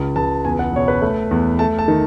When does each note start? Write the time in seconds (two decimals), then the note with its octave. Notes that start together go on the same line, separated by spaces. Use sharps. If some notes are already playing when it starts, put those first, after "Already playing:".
Already playing: C#2
0.16 C#2 A5
0.45 E2 G#5
0.59 F#5
0.73 B2 C#5
0.88 B4
1.02 A3
1.31 E2
1.59 A3 A5
1.79 A5
1.88 D#3